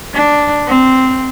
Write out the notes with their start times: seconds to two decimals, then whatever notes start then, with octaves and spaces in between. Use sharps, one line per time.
0.14 D4
0.67 C4